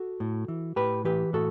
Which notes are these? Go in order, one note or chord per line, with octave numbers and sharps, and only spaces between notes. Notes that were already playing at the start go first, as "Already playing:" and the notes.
Already playing: F#4 A4
A2
E3
A2 G4 B4
E3 G4 B4
A2 F#4 A4